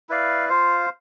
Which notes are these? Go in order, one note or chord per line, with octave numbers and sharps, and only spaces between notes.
E4 B4 D5 F5
F4 C5 F5